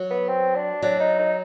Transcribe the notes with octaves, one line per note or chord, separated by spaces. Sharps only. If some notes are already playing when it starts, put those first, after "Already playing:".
Already playing: F#3
B3
C4
D4
F#3 D4
D#4
D#4